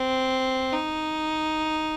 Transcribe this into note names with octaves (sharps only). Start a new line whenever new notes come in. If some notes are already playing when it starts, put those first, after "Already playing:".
Already playing: C4
D#4